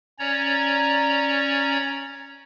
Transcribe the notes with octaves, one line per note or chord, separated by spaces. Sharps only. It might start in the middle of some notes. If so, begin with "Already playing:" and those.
C#4 C#5 D5 A#5